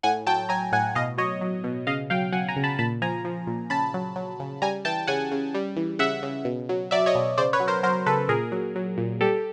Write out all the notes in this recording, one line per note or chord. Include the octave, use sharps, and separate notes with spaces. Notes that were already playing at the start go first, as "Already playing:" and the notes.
A2 F#5 G#5
F#3 G5 A5
F#3 G#5 A#5
A2 F#5 G#5
B2 D#5 F5
F#3 C#5 D#5
F#3
B2
C#3 D#5 F5
F#3 F5 G5
F#3 F#5 G#5
G#5 A#5
C#3
A5 B5
A#2 A5 B5
F3 G#5 A#5
F3
A#2
C#3 A5 B5
F#3
F#3
C#3
G3 G#5 A#5
E3 G5 A5
C#3 F#5 G#5
C#3
G3
E3
C#3 E5 F#5
C#3
B2
F#3
F#3 D5 E5
C#5 D#5
B2
C#3 C5 D5
B4 C#5
F#3
A#4 C5
F#3 A#4 C5
C#3 A4 B4
A#2 G#4 A#4
F#3
F#3
A#2
G3 G4 A4